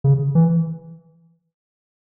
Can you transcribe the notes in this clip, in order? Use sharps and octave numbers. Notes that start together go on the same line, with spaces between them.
C#3
E3